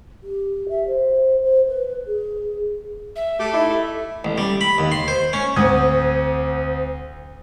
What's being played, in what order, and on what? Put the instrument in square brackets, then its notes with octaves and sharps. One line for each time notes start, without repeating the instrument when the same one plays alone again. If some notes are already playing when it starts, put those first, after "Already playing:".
[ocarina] G4
E5
C5
C5
B4
G#4
[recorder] E5
[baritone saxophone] A3 [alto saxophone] G4
[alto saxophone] D#4 [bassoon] E4
[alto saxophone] A4
[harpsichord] A1
G3
B5
D#2
C6
C5
C#4
[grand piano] D2 C4 F#5 D#6 G#6